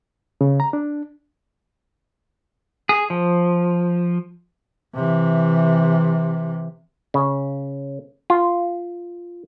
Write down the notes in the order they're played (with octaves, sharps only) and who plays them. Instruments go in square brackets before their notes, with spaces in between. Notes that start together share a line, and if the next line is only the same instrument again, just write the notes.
[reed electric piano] C#3
A#5
D4
[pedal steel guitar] G#4
F3
[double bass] C3 E3
[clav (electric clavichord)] C#3
F4